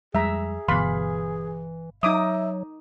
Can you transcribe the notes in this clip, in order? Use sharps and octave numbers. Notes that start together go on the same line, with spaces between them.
F2 G3 G#3 G#4 E5 A#5
G1 B2 E3 F5 B5 C6
F#3 D#4 E5 D6 D#6